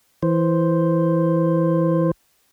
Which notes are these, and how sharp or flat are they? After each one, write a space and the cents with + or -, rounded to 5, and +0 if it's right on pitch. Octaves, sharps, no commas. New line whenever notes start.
E3 +0 C5 +0